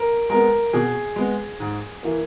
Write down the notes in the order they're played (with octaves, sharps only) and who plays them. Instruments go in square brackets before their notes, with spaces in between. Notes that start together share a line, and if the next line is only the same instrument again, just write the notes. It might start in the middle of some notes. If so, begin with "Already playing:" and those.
Already playing: [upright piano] A#4
G#3 B3 A#4
B2 G#4
G#3 B3
G#2
E3 A#3